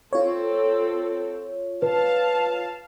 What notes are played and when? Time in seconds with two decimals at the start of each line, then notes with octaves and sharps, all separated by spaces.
0.13 C4 F4 A4 C#5
1.82 B4 F5 A5